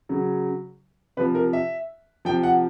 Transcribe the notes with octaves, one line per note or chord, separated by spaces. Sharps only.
C#3 F#3
C3 F3 B4
A#4
E5
C3 F3 G5
F#5